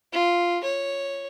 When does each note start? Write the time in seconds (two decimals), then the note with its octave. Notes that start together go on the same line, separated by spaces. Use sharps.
0.13 F4
0.64 C#5